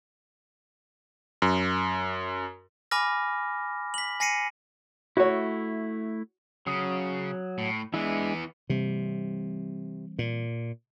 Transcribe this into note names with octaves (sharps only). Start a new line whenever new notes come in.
F#2
G#5 B5 D6 F6 A#6
B6 F#7
G#5 A#6 C7 C#7 D#7
A3 E4 F#4 C#5
C#3 F#3 D#6
A2
E3 G#3 B3 D4 E4
C3 E3 G3 C4
A#2